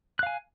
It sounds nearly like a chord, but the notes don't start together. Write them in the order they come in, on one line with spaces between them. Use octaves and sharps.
F#6 F5 G#5